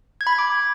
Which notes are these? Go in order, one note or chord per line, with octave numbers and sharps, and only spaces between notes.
G#6
B5
G#6
D6